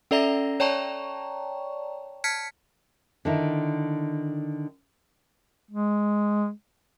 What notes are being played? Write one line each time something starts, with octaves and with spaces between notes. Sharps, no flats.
C#4 A4 D5 E5 A#5 A#6
C#5 D5 G5 A5 A#5 C#6
A5 F6 G#6 B6 C#7
D3 D#3 E4
G#3